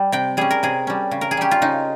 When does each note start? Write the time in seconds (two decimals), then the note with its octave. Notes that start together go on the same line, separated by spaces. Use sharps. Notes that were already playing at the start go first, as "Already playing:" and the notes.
Already playing: G3
0.12 C3 G5
0.37 G3 C#4 G#4
0.51 A#4
0.63 C3 G#4
0.87 G3 C#4
1.11 C#3
1.21 A#4
1.31 G#4
1.37 G3 C#4 G4
1.51 F4
1.62 C#3 D#4